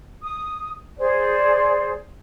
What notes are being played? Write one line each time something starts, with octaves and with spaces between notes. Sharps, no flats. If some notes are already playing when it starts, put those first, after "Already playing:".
D#6
G#4 C5 D5